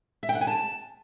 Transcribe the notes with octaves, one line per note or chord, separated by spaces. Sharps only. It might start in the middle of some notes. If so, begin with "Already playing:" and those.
E5
G5
F#5
G#5
A5